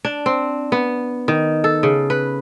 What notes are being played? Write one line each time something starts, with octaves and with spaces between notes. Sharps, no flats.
D4
C4
B3
D#3
A4
C#3
B4